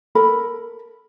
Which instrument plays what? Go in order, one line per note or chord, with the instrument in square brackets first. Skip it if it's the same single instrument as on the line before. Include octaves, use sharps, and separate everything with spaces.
[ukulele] A4 A#4 B5